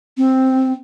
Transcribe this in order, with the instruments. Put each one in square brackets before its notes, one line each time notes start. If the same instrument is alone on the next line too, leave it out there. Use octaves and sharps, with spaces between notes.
[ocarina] C4